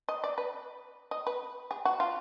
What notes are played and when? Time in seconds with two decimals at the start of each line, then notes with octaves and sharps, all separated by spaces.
0.09 D#5
0.24 D5
0.38 B4
1.11 D#5
1.27 B4
1.71 G#4
1.85 F#4
2.00 F4